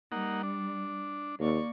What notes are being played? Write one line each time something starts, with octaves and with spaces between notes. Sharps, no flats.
G3 A#3 D#4 F#5
D4
D#2 A#3 D5 C#6